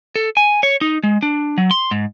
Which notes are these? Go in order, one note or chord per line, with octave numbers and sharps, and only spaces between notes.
A4
G#5
C#5
D#4
G#3
D4
F#3
C6
G#2